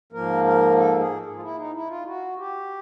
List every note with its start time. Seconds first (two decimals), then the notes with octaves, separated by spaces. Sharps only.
0.12 G#2 F3 A#3 A#4
0.44 A#4
0.78 A4
0.99 G#4
1.36 F4
1.42 E4
1.57 D#4
1.74 E4
1.89 F4
2.06 F#4
2.38 G4